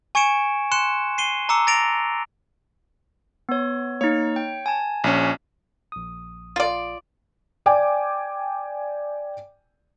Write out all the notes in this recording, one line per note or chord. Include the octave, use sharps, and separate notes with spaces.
G#5 C#6 G#6 C#7 D7 E7
C6 F#6 C#7 E7
C7 D#7 G7
A5 A#5 D6 E6 C#7
A#5 A6 A#6 D7 F7
B3 C#5
A#3 D#4 C#5
G5
G#5 A5
A#1 C#4
A#1 D#6
F4 D5
D5 G5 G#5 D6